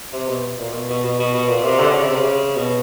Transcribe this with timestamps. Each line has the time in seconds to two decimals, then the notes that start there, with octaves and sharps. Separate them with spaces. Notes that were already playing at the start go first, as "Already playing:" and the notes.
0.13 C3
0.28 B2
0.59 A#2
0.74 B2
0.89 B2
1.04 B2
1.19 B2
1.34 B2
1.49 A#2
1.64 C3
1.79 D3
1.92 C#3
2.04 C3
2.16 C#3
2.55 B2